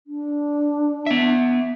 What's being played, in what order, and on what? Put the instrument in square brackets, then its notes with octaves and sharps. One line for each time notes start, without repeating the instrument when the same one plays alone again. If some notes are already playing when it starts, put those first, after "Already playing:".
[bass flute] D4
[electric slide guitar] B3 E5